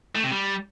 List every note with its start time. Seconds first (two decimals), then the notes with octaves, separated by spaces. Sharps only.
0.15 A3
0.23 C3
0.31 G3